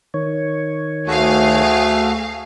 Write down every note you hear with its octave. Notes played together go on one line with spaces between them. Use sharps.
D#3 C#5
D2 A3 F#4 G#4 F5